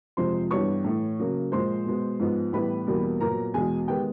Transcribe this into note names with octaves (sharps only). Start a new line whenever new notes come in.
F2 C3 F3 G#3 C5 C6
G2 E3 G3 B3 C#5 C#6
A2 E3 A3
C#3 F#3 A#3
A#2 F3 G#3 C5 C6
B2 G#3 B3
G#2 F3 G#3 B3
A2 E3 G3 B3 B4 B5
E2 B2 G3 A#3
A#2 F#3 B3 A#4 A#5
E2 B2 G#3 G#4 G#5
D#3 G#3 B3 G4 G5